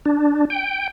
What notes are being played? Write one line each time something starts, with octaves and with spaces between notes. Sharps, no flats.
D4
G5